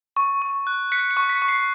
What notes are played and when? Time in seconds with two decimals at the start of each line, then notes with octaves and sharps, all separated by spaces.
0.17 C#6
0.42 C#6
0.67 F#6
0.92 F#6 B6 C#7
1.11 B6 C#7
1.17 C#6
1.29 B6 C#7
1.42 C#6
1.49 C7